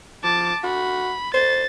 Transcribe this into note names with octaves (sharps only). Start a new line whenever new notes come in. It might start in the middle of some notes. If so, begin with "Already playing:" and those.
F3 A5 D6
F#4 B5
C5 A6